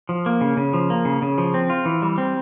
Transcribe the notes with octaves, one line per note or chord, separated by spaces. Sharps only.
F3
A#3
C#3
C#3
F3
A#3
C#3
C#3
F3
C4
F4
E3
G3
C4